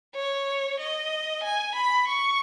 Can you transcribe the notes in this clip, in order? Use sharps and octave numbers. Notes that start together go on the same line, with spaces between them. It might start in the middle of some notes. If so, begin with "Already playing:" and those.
C#5
D#5
G#5
B5
C#6